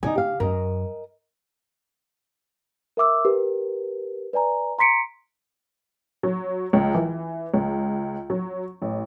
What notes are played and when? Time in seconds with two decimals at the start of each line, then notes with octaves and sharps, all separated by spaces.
0.03 D3 D#4 D5 G#5
0.15 G4 F5
0.40 F#2 A#4 D#5
2.97 A#4 E5 D6 E6
3.25 G4 A#4 B4
4.33 B4 D5 G#5 A#5
4.79 A#5 C6 B6 C#7 D7
6.23 F#3
6.73 C#2
6.95 E3
7.54 C#2
8.30 F#3
8.82 A1